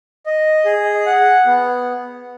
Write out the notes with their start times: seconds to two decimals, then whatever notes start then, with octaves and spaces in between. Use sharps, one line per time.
0.26 D#5
0.65 G#4
1.06 F#5
1.46 B3